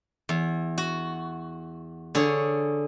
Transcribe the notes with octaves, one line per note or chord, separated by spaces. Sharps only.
E2
F#4
D3 G#4 C#5